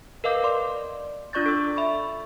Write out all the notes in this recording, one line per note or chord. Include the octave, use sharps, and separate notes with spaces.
A#4 B4 D#5 F5 D6 G6
D5 C6 D6
D4 F4 D5 C#6 G6 A6
A4 E6
E5 B5 C#6